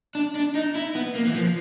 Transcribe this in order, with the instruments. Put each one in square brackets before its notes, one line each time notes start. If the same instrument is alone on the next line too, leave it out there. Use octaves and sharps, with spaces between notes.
[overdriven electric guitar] D4
D4
D#4
E4
B3
A#3
E3
F3